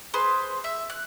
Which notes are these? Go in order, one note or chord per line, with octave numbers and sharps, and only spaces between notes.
G#4 B4 C5 C6
E5
F#6